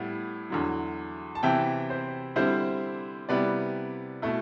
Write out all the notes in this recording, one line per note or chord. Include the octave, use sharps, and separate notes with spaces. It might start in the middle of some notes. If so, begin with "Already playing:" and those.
Already playing: A2 G3 B3 E4 F#5
E2 D3 F#3
A5
C3 E3 B3 E4 E5 G5
C5
D3 G3 C4 E4 C5
C3 G3 B3 E4 B4 D5
B2 A3 E4